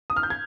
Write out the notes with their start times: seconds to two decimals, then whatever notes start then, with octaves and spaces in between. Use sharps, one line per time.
0.10 D#6
0.16 F6
0.23 G6
0.30 G#6